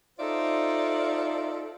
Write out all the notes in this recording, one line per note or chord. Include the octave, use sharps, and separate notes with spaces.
D#4 F4 A4 C5 D5 E5